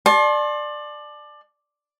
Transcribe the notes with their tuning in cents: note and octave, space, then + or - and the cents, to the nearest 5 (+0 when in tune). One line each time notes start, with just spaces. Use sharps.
D5 +20 A5 -25 C6 +35